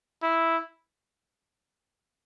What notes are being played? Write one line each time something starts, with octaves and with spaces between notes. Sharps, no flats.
E4